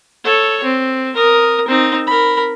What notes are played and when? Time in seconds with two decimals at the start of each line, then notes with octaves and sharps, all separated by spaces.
0.24 A4 C#5
0.64 C4
1.16 A#4 D#6
1.68 C4 D#4
2.07 A#4 B5